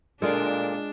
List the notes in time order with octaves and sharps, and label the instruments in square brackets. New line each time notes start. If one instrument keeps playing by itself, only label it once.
[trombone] A#2 [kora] G#3 F4 [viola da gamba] D4 [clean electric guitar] A4 A#4 D5